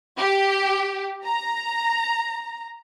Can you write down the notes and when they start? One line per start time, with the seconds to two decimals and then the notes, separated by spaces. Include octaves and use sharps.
0.18 G4
1.25 A#5